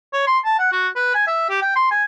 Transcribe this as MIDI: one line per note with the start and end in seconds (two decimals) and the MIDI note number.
0.13 0.23 73
0.27 0.39 84
0.45 0.55 81
0.59 0.71 78
0.73 0.88 66
0.96 1.11 71
1.15 1.27 80
1.27 1.46 76
1.50 1.57 67
1.62 1.73 79
1.76 1.87 84
1.91 2.05 80